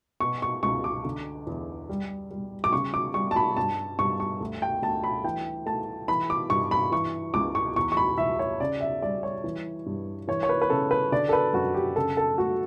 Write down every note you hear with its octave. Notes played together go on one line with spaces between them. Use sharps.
B2 C#6
C#6
C#2 C#6
D6
D3
E2
G3
G3
D6
C#3 C#6
D6
G3 C#6
A5
B5
G2 A5
G2 C#6
C#6
D2
G5
D2 A5
B5
E3 G5
A3 A5
E3 B5
D6
G2 C#6
B5
E3 C#6
C#2 D6
C#6
E2 C#6
C#6
B5
E2 E5
C#5
C#3 D5
E5
G3 D5
C#5
E3
G2
E3 C#5
C#5
B4
B4
C#3 A4
B4
D3 D5
A4
B4
F#2 F#4
G4
C#3 A4
A4
A3 F#4